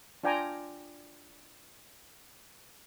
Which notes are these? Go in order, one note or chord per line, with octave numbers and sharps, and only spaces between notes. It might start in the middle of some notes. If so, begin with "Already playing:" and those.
D4 F4 D5 G5 G#5 A#5